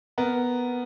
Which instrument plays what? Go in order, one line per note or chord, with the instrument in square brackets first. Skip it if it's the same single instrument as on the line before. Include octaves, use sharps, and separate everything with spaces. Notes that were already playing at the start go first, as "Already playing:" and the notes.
[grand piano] B3 A#4